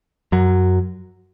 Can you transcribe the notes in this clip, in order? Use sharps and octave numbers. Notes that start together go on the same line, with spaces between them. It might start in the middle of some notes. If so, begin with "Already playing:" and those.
F#2 F#3